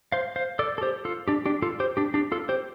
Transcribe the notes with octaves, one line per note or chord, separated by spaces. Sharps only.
C5 F5
C5 F5
A4 D5
A4
G4 C5
F4 A4
D4 G4
D4 G4
F4 A4
G4 C5
D4 G4
D4 G4
F4 A4
G4 C5